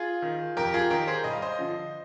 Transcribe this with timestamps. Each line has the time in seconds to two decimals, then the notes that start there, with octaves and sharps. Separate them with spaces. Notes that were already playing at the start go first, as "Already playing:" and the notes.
Already playing: F4 G#4
0.22 D#3
0.57 F2 G4 A#4
0.74 F4 G#4
0.90 D#3 G4 A#4
1.07 G#4 C5
1.24 G2 D#5
1.33 F5
1.42 C5 D#5
1.59 D3 F3